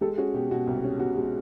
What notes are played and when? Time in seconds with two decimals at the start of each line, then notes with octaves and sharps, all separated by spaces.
0.01 G#3 G4 A4
0.17 C#4 F#4 G#4
0.34 B2 G4
0.51 B2 F#4
0.67 C2 G4
0.84 C#4
0.99 B2 F#4
1.17 G#3